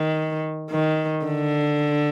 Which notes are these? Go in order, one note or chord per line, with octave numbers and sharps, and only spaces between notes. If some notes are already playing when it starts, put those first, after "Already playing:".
Already playing: D#3
D#3
D3